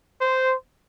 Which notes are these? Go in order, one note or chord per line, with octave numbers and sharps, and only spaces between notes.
C5